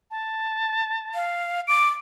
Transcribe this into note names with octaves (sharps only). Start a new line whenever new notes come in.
A5
F5
D6 D7